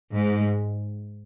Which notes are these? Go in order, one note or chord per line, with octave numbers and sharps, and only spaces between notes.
G#2